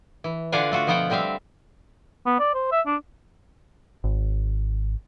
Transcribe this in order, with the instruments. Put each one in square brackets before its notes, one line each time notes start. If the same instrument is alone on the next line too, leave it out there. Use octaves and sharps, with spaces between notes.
[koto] E3
D3 D4 F4 F5 F#5 G#5
A3 F4 F#4
B2 F3 B3 F4 F#5 G5
D3 G3 C4 E5 F5
[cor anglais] B3
D5
C5
E5
D4
[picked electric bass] G#1